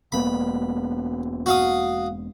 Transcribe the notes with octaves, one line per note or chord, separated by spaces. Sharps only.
E1 A#3 B3 B5
F#4 F5 D#6